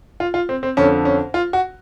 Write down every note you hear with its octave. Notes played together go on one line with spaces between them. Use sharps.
F4
F4
C4
C4
F2 D3 C#4
C#4
F4
F#4